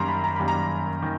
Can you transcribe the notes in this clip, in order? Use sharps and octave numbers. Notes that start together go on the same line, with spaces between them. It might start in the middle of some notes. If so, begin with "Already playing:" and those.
Already playing: F#2 D#3 G3 A#3 A#5 C6
B5
A#5
F#2 D#3 G3 A#3 B5
A#5
D#3